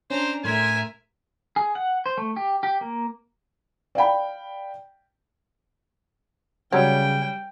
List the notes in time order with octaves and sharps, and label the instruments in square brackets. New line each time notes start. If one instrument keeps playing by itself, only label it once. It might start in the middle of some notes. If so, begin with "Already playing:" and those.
[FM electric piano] C#4 [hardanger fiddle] D4 A#5 [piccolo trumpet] C5
[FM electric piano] A2 A3 C6 [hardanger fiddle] A#4 E5 [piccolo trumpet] G#5
[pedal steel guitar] G#4
F#5
C5
A3
G4
G4
A#3
[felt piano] D5 F5 G5 B5
[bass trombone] C#3 [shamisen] F#3 [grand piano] G3 [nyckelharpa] G5